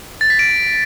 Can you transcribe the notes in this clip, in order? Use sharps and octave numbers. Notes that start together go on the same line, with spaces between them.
A6
B6
D7